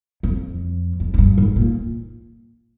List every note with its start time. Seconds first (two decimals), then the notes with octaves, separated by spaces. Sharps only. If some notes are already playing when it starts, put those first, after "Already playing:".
0.23 F2
1.00 F2
1.14 G#2
1.18 G2
1.38 G#2
1.56 A#2